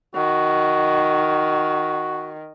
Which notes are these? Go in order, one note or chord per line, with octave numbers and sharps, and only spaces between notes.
D#3 F#4